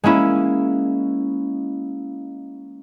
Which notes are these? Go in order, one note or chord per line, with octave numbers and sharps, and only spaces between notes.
G#3 A#3 C#4 E4